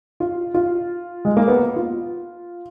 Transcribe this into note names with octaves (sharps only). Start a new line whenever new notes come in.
F4
F4
G#3
A#3
B3
F4